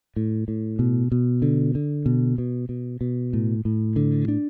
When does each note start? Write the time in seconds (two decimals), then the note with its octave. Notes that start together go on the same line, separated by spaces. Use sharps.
0.16 A2
0.48 A2
0.79 B2
1.12 B2
1.42 D3
1.75 D3
2.06 B2
2.38 B2
2.69 B2
3.01 B2
3.33 A2
3.65 A2
3.96 D3
4.28 D4